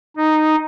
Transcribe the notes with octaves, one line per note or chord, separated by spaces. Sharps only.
D#4